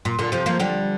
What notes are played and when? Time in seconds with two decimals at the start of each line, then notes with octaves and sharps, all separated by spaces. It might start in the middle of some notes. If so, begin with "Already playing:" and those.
0.05 A#2
0.19 A#2 D3
0.32 C3 F3
0.46 F3 A#3
0.60 D3 G3